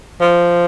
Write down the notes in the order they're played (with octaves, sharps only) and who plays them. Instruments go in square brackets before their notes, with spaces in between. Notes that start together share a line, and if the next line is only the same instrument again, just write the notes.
[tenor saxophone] F3